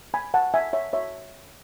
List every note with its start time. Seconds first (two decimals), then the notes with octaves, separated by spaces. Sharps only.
0.14 G#5 B5
0.34 F#5 A5
0.54 E5 G#5
0.73 C#5 E5
0.93 C#5 E5